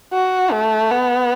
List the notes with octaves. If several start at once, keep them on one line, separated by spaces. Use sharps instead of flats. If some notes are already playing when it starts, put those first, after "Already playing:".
F#4
A3
B3